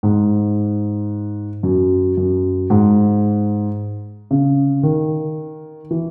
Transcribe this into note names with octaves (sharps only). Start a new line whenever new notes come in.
G#2
F#2
F#2
G#2
C#3
D#3
E3